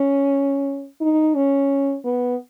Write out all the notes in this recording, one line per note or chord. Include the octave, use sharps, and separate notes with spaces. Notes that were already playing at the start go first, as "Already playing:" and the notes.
Already playing: C#4
D#4
C#4
B3